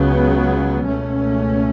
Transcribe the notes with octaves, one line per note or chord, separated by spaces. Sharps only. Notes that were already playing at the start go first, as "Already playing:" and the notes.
Already playing: C#2 C#3 F#3 B3
C#2 B2 A3 C#4